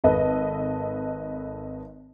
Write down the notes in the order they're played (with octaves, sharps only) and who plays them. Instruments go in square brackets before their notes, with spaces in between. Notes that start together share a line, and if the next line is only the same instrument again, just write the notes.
[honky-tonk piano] G#1 A4 B4 D#5